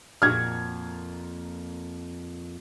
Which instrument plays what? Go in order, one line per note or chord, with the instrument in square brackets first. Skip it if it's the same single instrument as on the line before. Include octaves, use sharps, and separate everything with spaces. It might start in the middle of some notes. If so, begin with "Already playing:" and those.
[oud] F2 A#2 F#4 [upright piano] F6 G#6